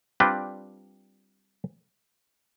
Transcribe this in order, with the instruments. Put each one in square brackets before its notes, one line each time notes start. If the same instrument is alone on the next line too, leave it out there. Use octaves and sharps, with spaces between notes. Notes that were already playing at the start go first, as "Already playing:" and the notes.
[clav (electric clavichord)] G3 C4 D4 F4 B4 G5